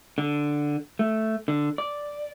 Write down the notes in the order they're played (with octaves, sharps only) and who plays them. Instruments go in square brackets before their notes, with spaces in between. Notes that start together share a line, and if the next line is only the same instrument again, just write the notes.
[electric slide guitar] D3
A3
D3
D5